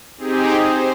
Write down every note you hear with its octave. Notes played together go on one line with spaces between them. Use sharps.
C4 D#4 G4 G#4
C5